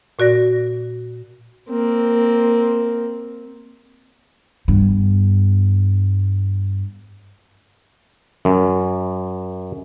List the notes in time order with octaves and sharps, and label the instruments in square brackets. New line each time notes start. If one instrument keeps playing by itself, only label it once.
[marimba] A#2 F#4 D5 A#6
[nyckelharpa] A#3 C4
[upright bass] G2 B3
[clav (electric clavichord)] F#2